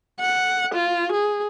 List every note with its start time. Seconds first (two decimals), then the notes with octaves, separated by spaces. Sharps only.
0.21 F#5
0.75 F4
1.13 G#4